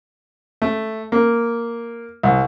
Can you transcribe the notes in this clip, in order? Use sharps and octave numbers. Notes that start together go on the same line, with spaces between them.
A3
A#3
C2